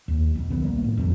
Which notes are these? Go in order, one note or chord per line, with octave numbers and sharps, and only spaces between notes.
D#2
B1
D#3 B3
G3 A#3
A2
F2 A2 A3